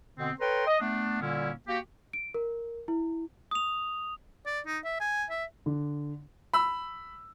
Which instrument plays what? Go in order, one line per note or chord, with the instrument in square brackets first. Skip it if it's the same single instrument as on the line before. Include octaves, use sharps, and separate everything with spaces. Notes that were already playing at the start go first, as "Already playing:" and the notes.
[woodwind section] B2 D3 B3 C4
A4 B4 C#5 G5 A#5 C6
D#5
A3 B3 D4
A#2 D3 G3 A#3 C#4 E4
A#3 F#4 G4
[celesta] D7
A#4
E4
[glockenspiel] D#6 F7
[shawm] D5
D#4
E5
G#5
E5
[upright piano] D3
[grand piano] B5 E6